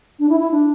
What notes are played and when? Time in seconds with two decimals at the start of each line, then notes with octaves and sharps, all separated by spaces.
0.19 D4
0.29 E4
0.40 E4
0.51 D4